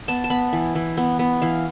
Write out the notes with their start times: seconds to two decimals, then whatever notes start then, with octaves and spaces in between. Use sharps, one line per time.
0.08 B3 A5
0.24 A5
0.30 B3 B5
0.53 E3
0.75 E3
0.97 B3
1.19 B3
1.41 E3 F5